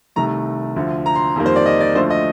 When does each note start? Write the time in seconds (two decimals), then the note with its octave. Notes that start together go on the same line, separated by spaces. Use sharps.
0.16 C2 C3 D#3 A3 A#5
0.76 D2 D3 F3
1.06 A#5
1.15 C6
1.36 F2 D#3 G3 A#3
1.46 C5
1.56 D5
1.66 D#5
1.81 D5
1.95 D2 D3 F3 A3 C5
2.10 D#5